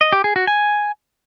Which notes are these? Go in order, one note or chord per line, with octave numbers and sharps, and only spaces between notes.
D#5
G4
G#4
F#4
G#5